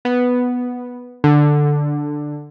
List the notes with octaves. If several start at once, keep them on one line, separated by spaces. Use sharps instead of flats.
B3
D3